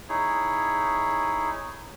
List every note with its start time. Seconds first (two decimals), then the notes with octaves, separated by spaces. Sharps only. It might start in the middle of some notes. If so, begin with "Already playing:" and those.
0.09 D#4 E4 G#4 C#5